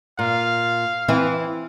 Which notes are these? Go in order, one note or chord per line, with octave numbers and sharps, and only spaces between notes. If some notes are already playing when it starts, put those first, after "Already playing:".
A#2 F5
E3 C4 E4